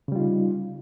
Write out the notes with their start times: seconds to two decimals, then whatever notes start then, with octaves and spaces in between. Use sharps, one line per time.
0.08 C#3
0.12 G3
0.16 F4
0.19 D#4